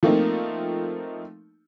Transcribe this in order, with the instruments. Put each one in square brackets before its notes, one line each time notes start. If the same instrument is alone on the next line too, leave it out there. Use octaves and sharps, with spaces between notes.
[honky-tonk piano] F3 A3 A#3 C4 D#4